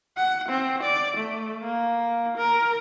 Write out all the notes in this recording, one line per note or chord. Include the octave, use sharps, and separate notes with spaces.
F#5
C4
D5
A3
A#3
A#4